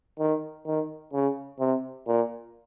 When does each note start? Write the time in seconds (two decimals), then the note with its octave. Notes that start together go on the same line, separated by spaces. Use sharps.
0.19 D#3
0.66 D#3
1.13 C#3
1.60 C3
2.07 A#2